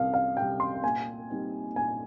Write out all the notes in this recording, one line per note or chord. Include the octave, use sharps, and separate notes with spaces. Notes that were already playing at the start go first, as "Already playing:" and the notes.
Already playing: C2 C3 F5
F5
C3 G3 G5
C6
A#2 G#5
G3 C4 D#4
A#2 G#5